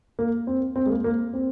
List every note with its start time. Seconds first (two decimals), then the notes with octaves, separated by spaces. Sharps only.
0.19 A#3
0.47 C4
0.76 C4
0.86 G#3
0.89 A#3
1.04 A#3
1.34 C4